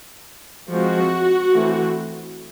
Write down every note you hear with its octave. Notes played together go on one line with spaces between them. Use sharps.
F3 G#3 C4 F#4
E3 A3 C4